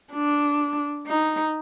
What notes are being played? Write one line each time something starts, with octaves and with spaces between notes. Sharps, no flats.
D4
D#4